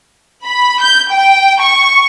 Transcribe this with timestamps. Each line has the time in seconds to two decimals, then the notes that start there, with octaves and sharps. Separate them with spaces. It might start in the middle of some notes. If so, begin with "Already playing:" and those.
0.45 B5
0.80 G6
1.11 G5
1.60 C#6